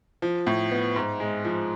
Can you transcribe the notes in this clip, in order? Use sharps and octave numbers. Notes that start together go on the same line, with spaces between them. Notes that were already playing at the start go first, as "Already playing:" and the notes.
F3
A2
B3
G#2
G#3
F3